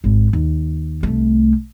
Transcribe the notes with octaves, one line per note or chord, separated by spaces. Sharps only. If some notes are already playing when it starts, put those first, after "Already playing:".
G#1
D#2
C2 A3